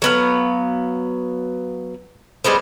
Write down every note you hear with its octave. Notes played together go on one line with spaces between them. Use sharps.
F#3 B3 F5
G3 G#3 B3 C5